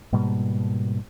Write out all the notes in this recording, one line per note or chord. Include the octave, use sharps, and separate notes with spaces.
G#2 B2 G3 A#3